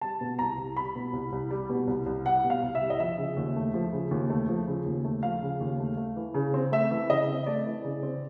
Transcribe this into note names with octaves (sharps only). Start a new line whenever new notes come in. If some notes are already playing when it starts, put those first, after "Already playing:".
G3 A5
B2
C2 A#5
C2
G3 B5
B2
C2
C2
G3
B2
C2
C2
G3 F#5
B2
F5
C2
E5
C2
D#5
F3 E5
C#3
D#2
A3
F3
C#3
D#2
A3
F3
C#3
D#2
A3
F3 F5
C#3
D#2
A3
A3
E3
C#3
C4
A3 E5
E3
C#3 D#5
C4
A3 D5
E3
C#3
C4